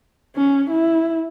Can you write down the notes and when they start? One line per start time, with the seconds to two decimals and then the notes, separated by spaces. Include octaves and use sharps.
0.36 C#4
0.70 E4